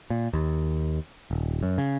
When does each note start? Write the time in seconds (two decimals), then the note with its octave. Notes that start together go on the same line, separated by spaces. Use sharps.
0.10 A#2
0.33 D#2
1.31 D#1
1.63 F#2
1.78 C#3